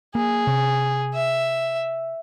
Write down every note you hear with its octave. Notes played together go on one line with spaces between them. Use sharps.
A#3 G#4
C3
E5